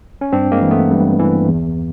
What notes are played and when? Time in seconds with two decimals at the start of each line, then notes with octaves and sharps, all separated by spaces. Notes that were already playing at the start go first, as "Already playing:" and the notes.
0.21 C#4
0.32 G2 C4 D4
0.52 G#3 A#3
0.61 E3
0.71 A3 B3
0.91 G2
1.19 E3
1.48 E2